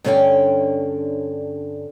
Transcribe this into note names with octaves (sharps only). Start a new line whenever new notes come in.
G2 D3 C#4 C#5 D5 G5